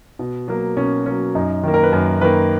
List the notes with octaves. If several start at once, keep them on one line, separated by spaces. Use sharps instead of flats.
B2
F#3 A#3
B2 C#4
F#3 A#3 C#4
F#2 D#4
D#3 A#3
A#4
B4
F#2 A#4
D#3 A#3 B4